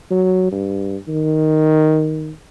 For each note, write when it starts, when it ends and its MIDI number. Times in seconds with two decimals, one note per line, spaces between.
0.11 0.52 54
0.52 0.97 43
1.08 2.31 51